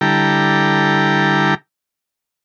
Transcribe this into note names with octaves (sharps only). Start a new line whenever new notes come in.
D3 G3 E4 A4 G5 A#5